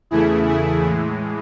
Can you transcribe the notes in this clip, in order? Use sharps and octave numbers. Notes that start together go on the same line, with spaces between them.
E2 C#3 E3 A3 E4 G#4
E4 G#4
A2 E3 G#3